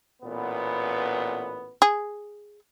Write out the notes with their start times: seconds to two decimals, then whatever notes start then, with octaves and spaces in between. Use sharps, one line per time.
0.22 A1 A#2 B3
1.82 G#4